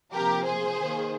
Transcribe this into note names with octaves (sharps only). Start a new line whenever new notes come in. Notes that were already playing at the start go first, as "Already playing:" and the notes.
C3 F3 A#3 G4 A#4
G#4 C5
D#3 A#3